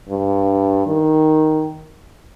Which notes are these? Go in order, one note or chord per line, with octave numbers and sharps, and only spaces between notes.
G2
D#3